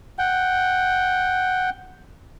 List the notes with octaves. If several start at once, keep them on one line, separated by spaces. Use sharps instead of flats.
F#5 G5